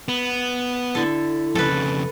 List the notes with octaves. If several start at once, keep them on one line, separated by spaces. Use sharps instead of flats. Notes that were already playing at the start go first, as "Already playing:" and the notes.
B3
D3 E4 A4
F2 C#3 A4 B4